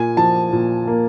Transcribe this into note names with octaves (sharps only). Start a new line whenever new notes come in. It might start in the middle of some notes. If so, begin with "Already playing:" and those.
Already playing: A#2 G#5
F3 A5
A#2
A#3